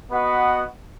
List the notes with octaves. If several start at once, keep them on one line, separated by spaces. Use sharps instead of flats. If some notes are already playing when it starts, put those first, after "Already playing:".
B3 F#4 B4 D#5 F#5